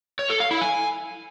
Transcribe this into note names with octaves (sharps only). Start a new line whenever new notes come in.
C#5
A4
F5
E4
G#5